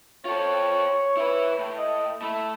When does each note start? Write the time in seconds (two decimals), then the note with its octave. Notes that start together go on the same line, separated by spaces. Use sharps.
0.25 F4 A4 C#5
1.17 E4 B4
1.59 A2
1.79 D#5
2.22 A3 E4